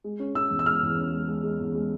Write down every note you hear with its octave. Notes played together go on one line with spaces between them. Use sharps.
G#3
C#4
C#4 E6
E2
E6
G#3 F6
E2
C#4
G#3
G#3
G#3
E2
G#3